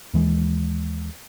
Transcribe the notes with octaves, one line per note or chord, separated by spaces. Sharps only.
D#2 E3 G#3